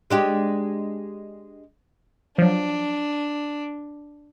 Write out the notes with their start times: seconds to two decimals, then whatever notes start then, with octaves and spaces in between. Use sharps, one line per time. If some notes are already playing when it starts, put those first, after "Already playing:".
0.10 G#3 D4 G4
2.38 F3 F#3 D4